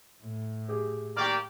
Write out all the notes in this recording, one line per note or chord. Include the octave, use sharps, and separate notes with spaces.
A2
G4 G#4
A#3 G4 D5 G5 C#6 F6